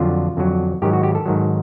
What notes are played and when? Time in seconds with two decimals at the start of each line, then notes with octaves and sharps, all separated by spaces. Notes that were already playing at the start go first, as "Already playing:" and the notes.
Already playing: F2 D3 F#3 F4
0.37 F2 D3 F#3
0.82 G#2 D#3 F#3 G4
0.93 F#4
1.03 G4
1.15 A4
1.26 G#2 D#3 F#3